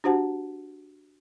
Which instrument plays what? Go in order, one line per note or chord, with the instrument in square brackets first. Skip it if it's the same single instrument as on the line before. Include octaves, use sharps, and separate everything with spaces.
[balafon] D4 F#4 G4 C5 F#5 A5